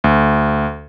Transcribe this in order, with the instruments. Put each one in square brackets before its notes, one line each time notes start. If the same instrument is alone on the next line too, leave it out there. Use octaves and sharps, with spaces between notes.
[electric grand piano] D2